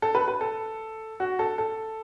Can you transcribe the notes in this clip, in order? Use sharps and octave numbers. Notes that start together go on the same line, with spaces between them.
A4
B4
B4
A4
F#4
A4
A4